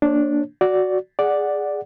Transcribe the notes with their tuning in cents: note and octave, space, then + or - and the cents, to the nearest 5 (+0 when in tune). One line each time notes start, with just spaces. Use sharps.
A#3 -10 D4 +0 C#5 -25
F#4 +0 D5 -10
G#4 -5 D5 +0 F#5 +0